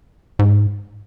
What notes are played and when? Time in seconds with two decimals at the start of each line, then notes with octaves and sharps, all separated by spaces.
0.39 G#2